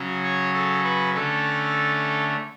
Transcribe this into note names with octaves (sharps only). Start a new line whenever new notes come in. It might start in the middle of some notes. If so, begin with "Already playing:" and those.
Already playing: C#3 F#3 C#4
C#5
A4
B4
D3 A3 C#4 A4